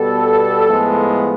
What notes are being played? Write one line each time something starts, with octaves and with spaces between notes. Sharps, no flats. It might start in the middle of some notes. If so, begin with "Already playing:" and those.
Already playing: B2 G3 B3 A4
A2 F3 G#3 B3